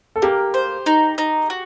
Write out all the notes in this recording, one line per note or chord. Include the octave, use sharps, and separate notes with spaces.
A4
A#3 G4
C5
D#4
D#4
F#4